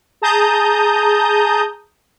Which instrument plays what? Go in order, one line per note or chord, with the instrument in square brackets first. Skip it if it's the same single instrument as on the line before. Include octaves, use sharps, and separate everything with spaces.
[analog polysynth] G#4 A5 A#5 D#6 G6